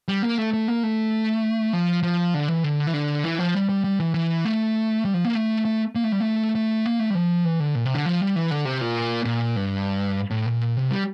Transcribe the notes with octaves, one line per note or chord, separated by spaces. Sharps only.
G3
A#3
A3
A3
A#3
A3
F3
F3
D3
E3
D3
E3
D3
E3
F3
G3
G3
G3
E3
E3
A3
G3
F3
A#3
A3
A3
A#3
A3
G3
A3
A3
A#3
A3
G3
F3
E3
D3
A#2
C3
D3
F3
G3
E3
D3
C3
A#2
A#2
G2
A2
A#2
C3
G3